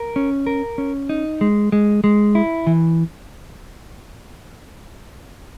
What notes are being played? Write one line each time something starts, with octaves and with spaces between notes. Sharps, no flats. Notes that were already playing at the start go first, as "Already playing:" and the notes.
Already playing: A#4
C#4
A#4
C#4
D#4
G#3
G#3
G#3
E4
E3